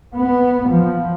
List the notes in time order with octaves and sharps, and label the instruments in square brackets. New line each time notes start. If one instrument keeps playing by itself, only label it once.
[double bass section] B3
F3